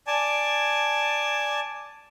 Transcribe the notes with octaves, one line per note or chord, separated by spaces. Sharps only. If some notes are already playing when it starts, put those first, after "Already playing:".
D5 G#5 A5